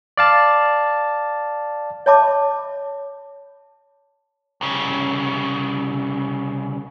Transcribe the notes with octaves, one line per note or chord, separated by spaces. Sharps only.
D5 F5 A5
C#5 D#5 E5 A5 B5 D6
C2 C#3